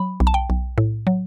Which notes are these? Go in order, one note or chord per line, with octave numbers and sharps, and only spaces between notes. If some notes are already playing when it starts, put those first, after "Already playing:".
Already playing: F#3 B5
B1
A5
G5
B1
A2
F#3